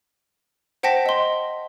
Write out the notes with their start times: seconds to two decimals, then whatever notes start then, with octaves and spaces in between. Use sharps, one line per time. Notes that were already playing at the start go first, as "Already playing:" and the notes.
0.83 C5 F#5 G5 A5 A#6 B6
1.06 D#5 C6